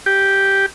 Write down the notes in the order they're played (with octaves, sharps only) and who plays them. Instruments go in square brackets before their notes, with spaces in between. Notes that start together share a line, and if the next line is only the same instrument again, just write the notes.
[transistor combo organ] G4